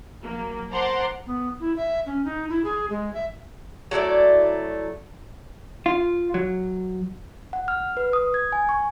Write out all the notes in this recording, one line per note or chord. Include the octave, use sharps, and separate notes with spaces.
F#3 A#3
C5 F#5 A5 A#5 C6 D6
B3
E4
E5
C#4
D#4
E4
G#4
G#3
E5
F#3 A3 E4 D5
F4
F#3
F#5
F6
B4
D#6
G#6
G#5
C#6